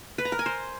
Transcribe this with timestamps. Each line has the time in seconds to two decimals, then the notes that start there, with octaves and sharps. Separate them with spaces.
0.18 B4
0.25 A#5
0.32 A#4
0.39 G#5
0.46 C5